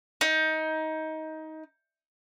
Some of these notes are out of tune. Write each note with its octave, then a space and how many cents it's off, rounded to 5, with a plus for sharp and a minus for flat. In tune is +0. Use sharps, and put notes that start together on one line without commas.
D#4 +20